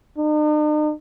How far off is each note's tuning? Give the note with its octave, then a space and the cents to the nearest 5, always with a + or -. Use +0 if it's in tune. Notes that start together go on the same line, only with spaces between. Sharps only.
D#4 -45